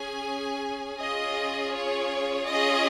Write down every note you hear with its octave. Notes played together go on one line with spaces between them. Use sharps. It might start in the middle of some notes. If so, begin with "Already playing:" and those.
Already playing: C#4 G#4 G#5
C#4 F4 G#4 D#5
C#5
C#4 F4 G#4 D#5